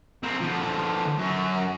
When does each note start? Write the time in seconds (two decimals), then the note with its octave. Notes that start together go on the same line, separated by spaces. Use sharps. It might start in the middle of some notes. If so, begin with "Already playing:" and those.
0.23 C4 A#4
0.41 D3 F3
1.19 F#2